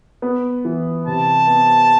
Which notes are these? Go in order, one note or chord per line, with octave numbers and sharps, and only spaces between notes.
B3
E3
C3 A5
B3